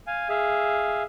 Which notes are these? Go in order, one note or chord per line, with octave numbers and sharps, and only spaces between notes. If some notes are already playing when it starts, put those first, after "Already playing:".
F5 G#5
G#4 E5 F5